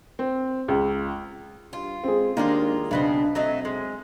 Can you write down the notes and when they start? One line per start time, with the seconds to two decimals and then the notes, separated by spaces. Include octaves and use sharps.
0.19 C4
0.68 C#2
1.73 G2 F4
2.04 G#3 C4 G#4
2.37 D#2 D#3 G#3 A#3 D4 F4
2.91 B1 C#3 B3 C4 D4
3.35 F#3 A3 C4 D#5
3.65 G#3